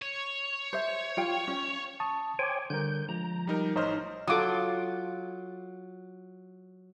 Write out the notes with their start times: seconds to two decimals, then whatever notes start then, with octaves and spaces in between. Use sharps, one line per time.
0.02 C#5
0.73 C5 E5
1.17 F4 G5
1.48 C#4
2.00 A5 C#6 D#6
2.39 C5 C#5 G5 G#5 D6
2.70 D3 G3 A#4 G6
3.09 F3 G#3 A#5
3.47 G3 D#4 A#4
3.76 A1 D#4 C5 C#5 D#5 F6
4.28 F#3 F4 A4 D6 D#6